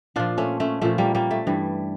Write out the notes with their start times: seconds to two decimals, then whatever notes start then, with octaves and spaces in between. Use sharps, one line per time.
0.16 A#2 F3 D4 F4
0.38 A3 C#4
0.60 A3 C#4
0.81 A#2 F3 A3 C#4
0.98 G3 A#3
1.15 G3 A#3
1.31 A3
1.47 G2 E3 G3